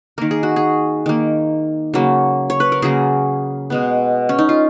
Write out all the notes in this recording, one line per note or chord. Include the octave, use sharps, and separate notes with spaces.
D#3 A#3 A#4
G#4
F#4
G#4
D#3 A#3
C#3 F#3 A#3
C#5
B4
A#4
C#3 F#3 A#3 G#4
B2 G#3 B3
C#4
D#4
F4